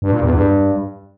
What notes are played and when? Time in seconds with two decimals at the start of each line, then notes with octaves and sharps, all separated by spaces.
0.02 G2
0.12 A#2
0.23 E2
0.33 G2